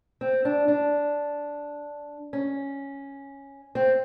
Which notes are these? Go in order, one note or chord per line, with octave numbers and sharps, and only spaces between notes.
C4
D4
D4
C#4
C4